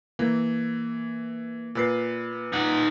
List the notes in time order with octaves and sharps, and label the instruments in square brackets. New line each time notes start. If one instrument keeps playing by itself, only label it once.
[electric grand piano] E3 [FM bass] A#3
[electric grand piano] A#2 B4 C7
[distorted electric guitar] D#4 F#5